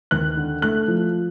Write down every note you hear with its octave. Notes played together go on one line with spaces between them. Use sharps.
D#2 F#6
D3
A3 F#6
F3